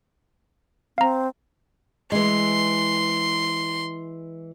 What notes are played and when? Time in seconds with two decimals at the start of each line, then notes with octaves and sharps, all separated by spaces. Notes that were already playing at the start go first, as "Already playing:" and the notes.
0.98 C4 F5 A#5
2.12 E3 G#3 C6